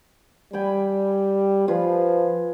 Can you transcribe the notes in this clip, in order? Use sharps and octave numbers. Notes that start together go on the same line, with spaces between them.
G3 G5 G#5 B5
F3 F4 G#4 B4